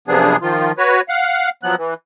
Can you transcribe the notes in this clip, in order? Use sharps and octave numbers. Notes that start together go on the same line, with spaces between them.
F#2 C3 F3 B3 D4 G#4
D#3 F3 F4
F#4 B4 C#5
F5 F#5
F3 F#3 B3 F#6
E3